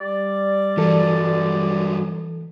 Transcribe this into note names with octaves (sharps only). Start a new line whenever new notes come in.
G3 D5
G2 E3 F#3 A4